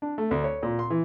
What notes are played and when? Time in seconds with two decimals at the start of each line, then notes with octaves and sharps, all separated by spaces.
0.02 D4
0.18 A3
0.31 D2
0.44 C#5
0.63 A#2
0.79 C6
0.90 E3